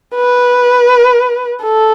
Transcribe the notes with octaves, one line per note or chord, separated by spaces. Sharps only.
B4
A4